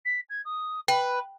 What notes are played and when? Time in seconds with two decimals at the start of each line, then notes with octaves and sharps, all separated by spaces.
0.05 B6
0.29 G#6
0.45 D#6
0.88 B4 G5 B5